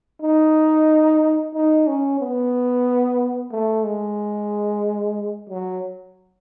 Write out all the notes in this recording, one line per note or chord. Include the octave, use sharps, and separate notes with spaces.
D#4
D#4
C#4
B3
A3
G#3
F#3